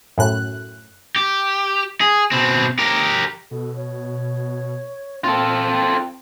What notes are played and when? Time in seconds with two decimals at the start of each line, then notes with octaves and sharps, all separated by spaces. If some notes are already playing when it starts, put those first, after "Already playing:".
0.18 F#2 A2 F#6
1.16 G4
2.01 G#4
2.32 B2 C4
2.79 G4 A#4
3.51 B2 A4
3.76 C#5
5.24 A#2 C4 F4 A4 G5